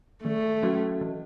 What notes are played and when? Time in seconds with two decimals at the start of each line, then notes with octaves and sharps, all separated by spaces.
0.24 D#3 A3
0.62 F#3 C#4 F#4 A4
1.01 E3